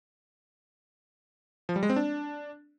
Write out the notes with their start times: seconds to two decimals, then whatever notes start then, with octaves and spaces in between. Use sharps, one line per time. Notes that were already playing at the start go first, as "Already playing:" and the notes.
1.69 F3
1.76 G3
1.83 G#3
1.90 C4
1.96 D4